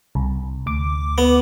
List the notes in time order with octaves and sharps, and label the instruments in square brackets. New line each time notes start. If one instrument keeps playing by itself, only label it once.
[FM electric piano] C2
D2 D6
[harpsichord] B3